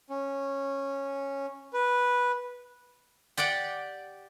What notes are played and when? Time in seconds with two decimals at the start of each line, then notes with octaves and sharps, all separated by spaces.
0.10 C#4
1.73 B4
3.37 G4 D5 F#5 G5